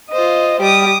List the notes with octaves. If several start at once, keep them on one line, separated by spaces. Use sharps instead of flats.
F4 C5 D#5
G3 D6 D#6